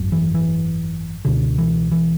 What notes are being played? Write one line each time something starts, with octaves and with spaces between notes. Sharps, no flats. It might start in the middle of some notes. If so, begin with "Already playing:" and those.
Already playing: G#1 F#2
E3
E3
C#2 B2 D3
E3
E3